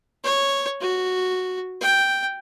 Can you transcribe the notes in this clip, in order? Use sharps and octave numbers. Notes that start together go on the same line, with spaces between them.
C#5
F#4
G5